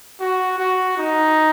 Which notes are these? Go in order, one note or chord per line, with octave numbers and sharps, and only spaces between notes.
F#4
F#4
D#4